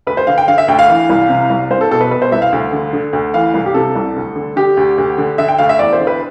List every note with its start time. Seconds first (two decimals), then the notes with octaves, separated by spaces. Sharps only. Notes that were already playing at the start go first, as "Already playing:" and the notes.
0.07 D2 B4
0.17 C5
0.27 D3 F5
0.38 G5
0.48 D3 F5
0.58 E5
0.68 D2 G5
0.79 F5
0.88 E3
1.09 C2
1.29 C3
1.50 C2
1.71 C2 C5
1.81 A4
1.91 B2 A4
2.01 B4
2.11 B2 B4
2.22 C5
2.32 C2 E5
2.42 F5
2.52 D2
2.72 D3
2.93 D3
3.13 D2
3.34 E3 F5
3.54 C2
3.66 G4
3.74 C3 A4
3.95 C2
4.16 D2
4.36 D3
4.56 D3 G4
4.77 D2
4.98 D2
5.18 D3
5.38 D3 E5
5.48 G5
5.58 D2 F5
5.69 E5
5.79 E2 D5
5.93 C5
6.00 D3
6.07 B4